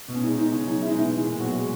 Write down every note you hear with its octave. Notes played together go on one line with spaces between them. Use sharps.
B2
C#4
G#3 D#4
B2 D#4
C#3 C#4
F#3 D#4
G#3 E4
D#4
B2 E3 E4
G#3
A#2
B2 F#3 F#4
G#3